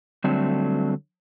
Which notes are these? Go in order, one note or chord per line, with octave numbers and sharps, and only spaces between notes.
D3 F#3 G3 A3 C4 D4